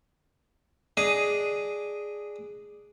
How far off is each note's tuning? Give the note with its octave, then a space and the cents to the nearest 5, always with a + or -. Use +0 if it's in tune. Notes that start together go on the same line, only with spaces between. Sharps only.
D4 +0 G#4 +0 D#5 +5